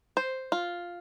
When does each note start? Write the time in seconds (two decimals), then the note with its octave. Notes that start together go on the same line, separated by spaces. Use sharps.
0.17 C5
0.52 F4